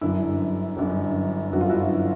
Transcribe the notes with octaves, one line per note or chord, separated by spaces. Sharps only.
G1 F#2 D3 E4
G1 F#2 D3
G1 F#2 D3 F#4
F4
E4 F#4